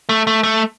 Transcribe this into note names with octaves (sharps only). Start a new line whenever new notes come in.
A3
A3
A3